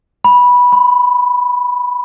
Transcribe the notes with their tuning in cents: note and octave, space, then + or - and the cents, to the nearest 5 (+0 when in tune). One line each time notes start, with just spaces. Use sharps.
B5 -10
B5 +35